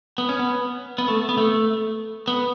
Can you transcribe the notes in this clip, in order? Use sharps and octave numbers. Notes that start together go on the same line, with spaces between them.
B3
C#4
B3
B3
A3
B3
A3
B3